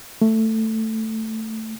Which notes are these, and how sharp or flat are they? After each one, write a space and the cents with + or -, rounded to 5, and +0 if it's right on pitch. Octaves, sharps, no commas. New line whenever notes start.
A3 +10